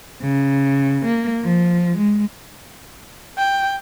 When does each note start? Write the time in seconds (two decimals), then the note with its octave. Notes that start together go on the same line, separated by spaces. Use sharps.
0.21 C#3
1.05 A#3
1.44 F3
1.97 G#3
3.38 G5